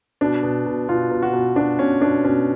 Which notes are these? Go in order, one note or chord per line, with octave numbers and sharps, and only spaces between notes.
B2 D4
B2
B2
B2 F4
B2
F#4
B2
B2 D4
B2 C#4
B2 D4
B2 C#4